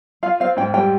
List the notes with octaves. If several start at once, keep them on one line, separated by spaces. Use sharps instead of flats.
F4 F5
C4 F5
G#2 G5
G3 G5